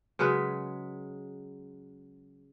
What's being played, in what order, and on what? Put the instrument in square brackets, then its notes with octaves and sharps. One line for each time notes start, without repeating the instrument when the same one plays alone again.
[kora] C#3 F#3 G#3 B4